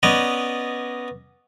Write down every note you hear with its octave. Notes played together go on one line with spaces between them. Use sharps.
B3 C#4 B4 D5 D#5 A#5